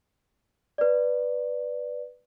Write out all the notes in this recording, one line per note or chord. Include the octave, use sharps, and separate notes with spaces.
B4 D5